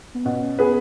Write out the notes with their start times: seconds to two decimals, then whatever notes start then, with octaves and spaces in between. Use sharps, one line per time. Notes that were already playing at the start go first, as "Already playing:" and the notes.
0.15 B3
0.25 B2 C#4
0.59 B3 G#4 B4